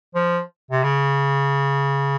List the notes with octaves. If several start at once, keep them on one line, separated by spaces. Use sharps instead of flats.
F3
C3
C#3